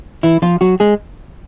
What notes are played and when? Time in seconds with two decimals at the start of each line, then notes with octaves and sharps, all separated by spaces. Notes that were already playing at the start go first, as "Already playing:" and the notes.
0.23 E3 E4
0.42 F3 F4
0.61 F#3 F#4
0.80 G#3 G#4